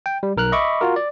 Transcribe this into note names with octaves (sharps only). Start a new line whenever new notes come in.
G5
G3
B1 A#4 F6 F#6
D#5 E5 B5 C#6 D6
F4 F#4 A#4
D5